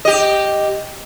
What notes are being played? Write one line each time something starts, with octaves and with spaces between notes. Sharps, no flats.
G4 D#5